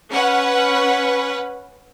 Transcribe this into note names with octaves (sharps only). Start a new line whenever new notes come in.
C#4 B4 F#5